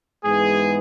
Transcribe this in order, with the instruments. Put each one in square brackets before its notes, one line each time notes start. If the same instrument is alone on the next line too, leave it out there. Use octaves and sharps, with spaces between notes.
[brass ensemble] G#2 E3 G#3 B3 G#4